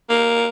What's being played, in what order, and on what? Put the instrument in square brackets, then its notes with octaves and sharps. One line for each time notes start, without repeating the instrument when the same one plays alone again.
[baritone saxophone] A#3